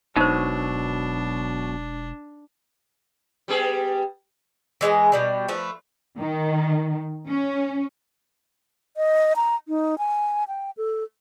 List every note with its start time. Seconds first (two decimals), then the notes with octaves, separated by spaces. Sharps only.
0.16 E1 B2 F#3 D4 D#4 C5
3.48 G3 B3 G#4
4.81 E3 G#3 C#5 D#5
5.12 B2 G3 D4
5.48 F3 A3 B4
6.19 D#3
7.28 C#4
8.97 D#5
9.36 A#5
9.68 D#4
9.98 G#5
10.48 G5
10.77 A4